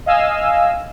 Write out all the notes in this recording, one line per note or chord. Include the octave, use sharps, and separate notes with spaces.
D#5 F5 G#5 E6